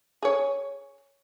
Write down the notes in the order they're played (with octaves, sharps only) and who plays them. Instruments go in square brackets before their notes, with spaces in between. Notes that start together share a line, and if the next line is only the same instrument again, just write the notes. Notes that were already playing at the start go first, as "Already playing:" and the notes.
[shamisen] G#4 C#5